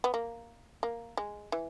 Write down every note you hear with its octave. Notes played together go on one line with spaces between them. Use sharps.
B3
A#3
A#3
G#3
E3